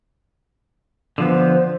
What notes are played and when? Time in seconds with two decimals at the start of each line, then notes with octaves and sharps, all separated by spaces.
1.18 D3 F3 B3 C5